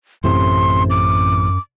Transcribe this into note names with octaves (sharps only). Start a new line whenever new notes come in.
A1 F#2 A2 C3 C6
D6